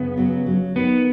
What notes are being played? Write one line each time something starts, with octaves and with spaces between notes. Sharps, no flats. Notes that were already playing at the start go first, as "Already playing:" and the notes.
Already playing: F#2 C#3 B3
F#3
F#3
D#3 B3